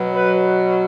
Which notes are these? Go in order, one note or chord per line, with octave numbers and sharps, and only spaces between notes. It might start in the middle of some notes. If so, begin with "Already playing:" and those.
Already playing: B2 F#3
B4